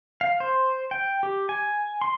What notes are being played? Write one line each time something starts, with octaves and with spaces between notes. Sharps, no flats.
F5
C5
G5
G4
G#5
C6